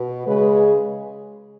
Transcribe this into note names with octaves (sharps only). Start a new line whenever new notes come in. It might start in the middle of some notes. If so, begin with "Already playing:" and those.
Already playing: B2
C#3 G#3 B4
G#4